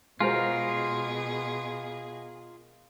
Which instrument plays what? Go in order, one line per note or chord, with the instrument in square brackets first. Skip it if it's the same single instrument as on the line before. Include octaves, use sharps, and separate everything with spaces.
[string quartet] B2 G#4 [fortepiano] G#3 F#4 C5 [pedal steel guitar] F4 A#4